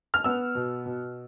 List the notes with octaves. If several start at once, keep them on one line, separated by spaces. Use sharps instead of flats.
F6
B3 E6
B2
B2